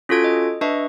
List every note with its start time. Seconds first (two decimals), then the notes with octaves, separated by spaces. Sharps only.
0.09 C#4 F4 F#4 A4 G#6 D7
0.24 D#5
0.61 D4 B4 D#5 E5 C#6